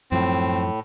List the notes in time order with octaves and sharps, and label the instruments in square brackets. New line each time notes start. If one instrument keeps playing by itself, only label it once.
[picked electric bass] F#2 F3 [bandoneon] A2 [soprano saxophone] C4